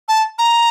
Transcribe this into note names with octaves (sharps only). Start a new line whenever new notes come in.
A5
A#5